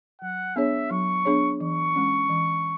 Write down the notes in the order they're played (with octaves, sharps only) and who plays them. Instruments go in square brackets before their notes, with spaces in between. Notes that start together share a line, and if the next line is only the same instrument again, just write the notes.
[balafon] F#3 [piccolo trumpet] F#5
[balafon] B3 D4 G#4 C#5 [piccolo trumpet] E5
[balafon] F#3 [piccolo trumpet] C#6
[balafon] B3 D4 G#4 C#5
[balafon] E3 [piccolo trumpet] C#6
[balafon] G#3 C#4
E3